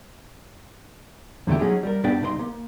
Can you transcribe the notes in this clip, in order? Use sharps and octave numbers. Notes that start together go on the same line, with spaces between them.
E2 D3 A3 E4 G4
F#3 G#3 C#4 D#4 G#4
G3 A#4
G2 B3 D4 G4 D5 G5
C2 D#4 A#4 C6
A#3